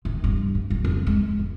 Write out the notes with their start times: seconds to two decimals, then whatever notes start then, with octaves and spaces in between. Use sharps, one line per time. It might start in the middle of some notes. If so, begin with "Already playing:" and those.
0.05 D#3
0.24 G2
0.55 D2
0.70 F#3
0.84 F2
1.07 G#3
1.39 F2